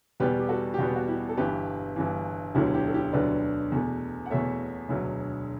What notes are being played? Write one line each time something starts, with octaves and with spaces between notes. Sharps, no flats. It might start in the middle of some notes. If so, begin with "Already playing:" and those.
E2 B2 G3 B3 G4 B4
G4
F#4 A4
G4
E2 B2 G3 B3 F#4
F#4
E4 G4
A4
G1 G2 E3 G4 B4
G1 G2 E3
E1 D2 D3 F#3 A3 E4 G4
E4 G4
A4
E4 G4
E1 D2 D3 F#3 A3 B4 D5
E2 B2 A3
F#5
E2 B2 A3 C#5 E5
E1 D2 D3 F#3